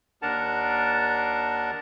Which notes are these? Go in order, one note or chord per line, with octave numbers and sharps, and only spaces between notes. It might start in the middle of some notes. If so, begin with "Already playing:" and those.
D#2 D4 A#4 F#5 A5 A#5